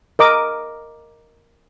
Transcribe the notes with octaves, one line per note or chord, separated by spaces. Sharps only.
A#4 D#5 D6